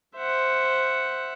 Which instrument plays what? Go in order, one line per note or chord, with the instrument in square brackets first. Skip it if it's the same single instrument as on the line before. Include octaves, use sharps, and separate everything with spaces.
[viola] C5 [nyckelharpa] E5 F#5